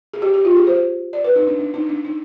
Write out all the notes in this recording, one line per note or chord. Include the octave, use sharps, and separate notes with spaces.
G#4
G4
G4
F4
G4
G#4
C5
D5
B4
D#4
D4
D4
D#4
D4
D#4